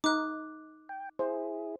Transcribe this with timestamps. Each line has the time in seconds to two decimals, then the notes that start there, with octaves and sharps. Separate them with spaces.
0.04 D#4 D6 F#6
0.89 G5
1.19 E4 G#4 C5